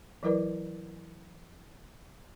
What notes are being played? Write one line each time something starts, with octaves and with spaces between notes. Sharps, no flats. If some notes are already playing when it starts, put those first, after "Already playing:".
E3 F#3 E4 A#4 B4 D5